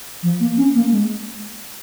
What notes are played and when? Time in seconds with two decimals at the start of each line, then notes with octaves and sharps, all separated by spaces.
0.23 F3
0.40 A#3
0.57 C#4
0.75 A#3
0.92 G#3